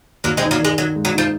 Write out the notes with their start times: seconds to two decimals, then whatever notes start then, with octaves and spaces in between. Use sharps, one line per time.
0.24 D#2 F#3 A#3
0.37 G#3 C4
0.43 D#4
0.51 F#3 A#3
0.60 D#3 G#3
0.78 D#3 F#3
0.96 G#3
1.05 F#3
1.14 F3 D#4